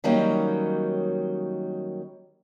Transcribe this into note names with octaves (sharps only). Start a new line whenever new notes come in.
D#3 F#3 G3 A#3 C#4 D#4